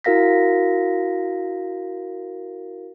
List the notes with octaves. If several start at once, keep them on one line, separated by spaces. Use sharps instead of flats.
E4 F#4 A#4 F5 A#6 B6